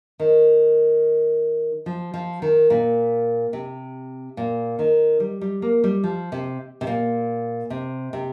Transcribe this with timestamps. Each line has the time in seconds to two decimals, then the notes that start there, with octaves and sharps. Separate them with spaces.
0.20 D#3
1.86 F3
2.14 F3
2.42 D#3
2.70 A#2
3.53 C3
4.37 A#2
4.79 D#3
5.20 G3
5.41 G3
5.62 A#3
5.84 G3
6.04 F3
6.32 C3
6.81 C3
6.87 A#2
7.70 C3
8.13 C3